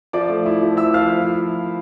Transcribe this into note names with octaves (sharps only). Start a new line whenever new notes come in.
F3 D5 D6
A3
E4
F3
E4 E5 E6
F3 F5 F6